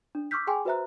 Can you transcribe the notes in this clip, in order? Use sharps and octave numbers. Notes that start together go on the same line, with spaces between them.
D4
C#6 D6 E6 F6 G6 B6
G#4 G5 G#5 C6 D6
F#4 B4 C5 E5 A#5 F#6